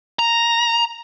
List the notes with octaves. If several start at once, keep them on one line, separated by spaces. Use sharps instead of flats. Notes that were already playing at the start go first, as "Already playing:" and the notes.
A#5